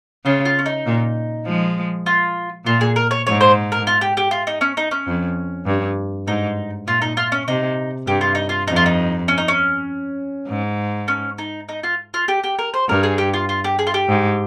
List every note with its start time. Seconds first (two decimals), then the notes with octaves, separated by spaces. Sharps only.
0.25 C#3 F4
0.45 F4
0.59 C#4
0.66 D#4
0.86 A#2
1.46 F3 G#3
2.06 F4
2.65 A#2 F4
2.81 G#4
2.96 A#4
3.11 C#5
3.27 G#2 C#5
3.41 C5
3.72 A#4
3.87 F4
4.01 G4
4.17 G4
4.31 F4
4.47 D#4
4.61 C#4
4.77 D#4
4.91 C#4
5.07 F2
5.66 G2
6.27 G#2 D#4
6.86 A#2 F4
7.02 D#4
7.17 F4
7.32 C#4
7.48 C3 D#4
8.07 G2 G4
8.21 F4
8.35 D#4
8.49 F4
8.68 F2 D#4
8.76 F4
8.86 D#4
9.28 C#4
9.38 D#4
9.48 C#4
10.48 G#2
11.08 C#4
11.38 D#4
11.69 D#4
11.83 F4
12.14 F4
12.28 G4
12.44 G4
12.59 A#4
12.74 C5
12.88 G2 A#4
13.03 G#4
13.18 G4
13.34 F4
13.49 F4
13.64 G4
13.79 G#4
13.87 F4
13.94 G4
14.09 G#2